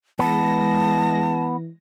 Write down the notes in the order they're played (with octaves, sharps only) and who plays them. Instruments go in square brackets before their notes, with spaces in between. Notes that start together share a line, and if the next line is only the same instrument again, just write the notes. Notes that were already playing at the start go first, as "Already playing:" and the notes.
[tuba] E3 [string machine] G#3 A#6 [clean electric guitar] B3 [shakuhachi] A5